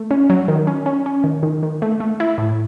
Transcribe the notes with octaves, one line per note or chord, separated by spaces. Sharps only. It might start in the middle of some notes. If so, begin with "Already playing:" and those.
Already playing: A3
C#4
F#3
D#3
C#4
C#4
C#4
D#3
D#3
D#3
A3
A3
E4
A2